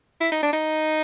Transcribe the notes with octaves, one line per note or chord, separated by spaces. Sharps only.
E4
D#4
D4
D#4